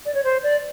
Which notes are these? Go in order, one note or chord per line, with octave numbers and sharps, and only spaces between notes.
D5
C#5
C5
D5